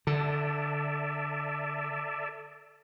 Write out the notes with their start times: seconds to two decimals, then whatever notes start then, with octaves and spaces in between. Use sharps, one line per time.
0.07 D3 A4 D5 E5